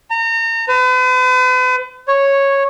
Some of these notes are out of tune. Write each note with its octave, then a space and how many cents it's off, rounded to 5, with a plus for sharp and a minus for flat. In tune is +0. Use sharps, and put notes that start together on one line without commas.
A#5 -35
B4 +45
C#5 -5